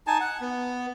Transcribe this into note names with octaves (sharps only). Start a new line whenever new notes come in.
D#4 G#5 A5
F#5
B3